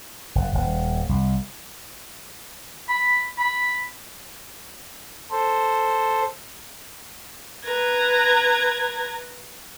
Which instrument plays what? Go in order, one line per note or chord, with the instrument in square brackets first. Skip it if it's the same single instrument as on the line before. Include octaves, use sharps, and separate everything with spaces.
[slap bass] F#1
D#1
C2
[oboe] B5
B5
[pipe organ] A4 C5
[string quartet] B4 A#5 G#6